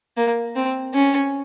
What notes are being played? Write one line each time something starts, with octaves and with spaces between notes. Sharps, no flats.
A#3
C4
C#4